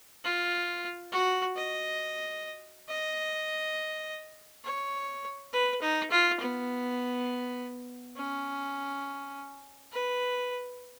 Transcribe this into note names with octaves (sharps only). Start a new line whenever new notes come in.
F4
F#4
D#5
D#5
C#5
B4
D#4
F4
B3
C#4
B4